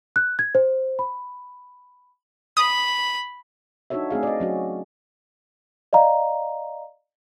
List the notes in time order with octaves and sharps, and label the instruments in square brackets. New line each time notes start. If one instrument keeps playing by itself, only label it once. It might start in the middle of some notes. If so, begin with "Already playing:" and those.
[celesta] F#6
G#6
C5
B5
[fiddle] B5 [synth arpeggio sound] D#6
[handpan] D4 D#4 F#4 A4 C#5 E5
A3 C4 G#4 F5
D5 D#5
F#3 C#4 F#4
[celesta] D5 D#5 F5 A#5